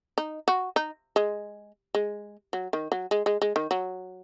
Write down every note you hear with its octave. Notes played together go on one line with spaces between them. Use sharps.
D#4
F#4
D#4
G#3
G#3
F#3
D#3
F#3
G#3
G#3
G#3
D#3
F#3